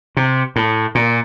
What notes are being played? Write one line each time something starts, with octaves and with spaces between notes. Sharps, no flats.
C3
A2
A#2